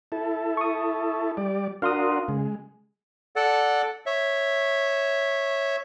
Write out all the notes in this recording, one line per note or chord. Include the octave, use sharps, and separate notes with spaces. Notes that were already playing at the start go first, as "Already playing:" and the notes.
E4 A4
C#6 D#6
G3 D5
D4 F#4 A#4 F5 C6 D#6
C#3 G#3
A4 D5 F#5
C#5 E5